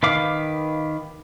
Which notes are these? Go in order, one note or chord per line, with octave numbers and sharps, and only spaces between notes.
D#3 B4 F5 D6